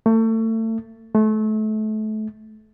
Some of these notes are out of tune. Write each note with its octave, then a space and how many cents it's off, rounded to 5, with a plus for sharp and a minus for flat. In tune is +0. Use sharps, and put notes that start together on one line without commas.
A3 +30
A3 -30